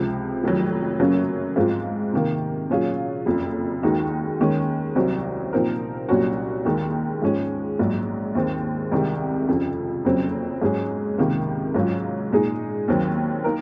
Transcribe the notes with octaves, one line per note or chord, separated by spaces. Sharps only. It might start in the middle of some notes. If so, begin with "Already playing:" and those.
Already playing: C#2 C3 F3 C4
F1 F2 D#3 F#3
F#2 C#3 F#3 A#3 C#4
G#2 F3 G#3 C4 F4
C3 D#3 A#3
A#2 F#3 C#4 F4 G#4
F#1 F2 C#3
D#2 D#3 G#3 D#4 F#4
D#2 D#3 G#3 C#4
C2 C3 F#3 C4 F#4
A#2 F3 C4 D#4 A#4
C2 A#2 F#3 C#4 F#4
D#2 D#3 G#3 D#4
G#2 F3 G#3 C#4
A#1 G#2 F#3
D#2 D#3 G#3 C4
C2 C3 D#3 G#3
F2 C#3 F3
F#1 F2 C#3 F#3 C4
G#2 F#3 C#4 G#4
C#2 C3 D#3 A#3
G#2 F#3 C#4 F4
A#2 G#3 D#4 G#4
D#2 D#3 F#3 C4
A#3 D#4 A#4